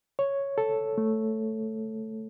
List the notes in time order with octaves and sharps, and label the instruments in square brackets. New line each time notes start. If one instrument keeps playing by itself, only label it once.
[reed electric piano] C#5
A4
A3